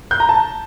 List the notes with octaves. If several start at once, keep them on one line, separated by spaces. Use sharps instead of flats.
G6
A#5
A5